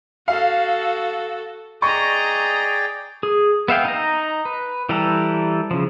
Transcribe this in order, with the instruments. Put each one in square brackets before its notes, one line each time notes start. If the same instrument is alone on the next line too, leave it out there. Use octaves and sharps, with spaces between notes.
[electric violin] F#4 A4 [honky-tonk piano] F5
[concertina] G#4 D5 G5 [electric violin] D#5 A#5 [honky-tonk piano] C#6
[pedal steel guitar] G#4
B3 E5 F5 G5
D#4 A#5
B4
E3 G3 G4 A4 A#5
C#3 F3